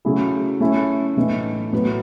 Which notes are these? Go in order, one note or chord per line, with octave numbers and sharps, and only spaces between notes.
C#3 F#3 A3 E4 G#4
A3 C#4 E4 A4
A2 E3 A3 D#4
A2 F#3 B3